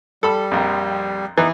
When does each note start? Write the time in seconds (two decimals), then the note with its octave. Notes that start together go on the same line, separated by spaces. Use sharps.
0.23 G3 A4 B5 E6
0.51 A#1 F2
1.38 E3 B3 D#4